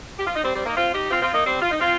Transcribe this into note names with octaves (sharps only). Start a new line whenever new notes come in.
G4
F4
D#4
G3 C4
G3 C4
A#3 D#4
C4 F4
D#4 G4
C4 F4
C4 F4
A#3 D#4
G3 C4
F4
D#4
C4 F4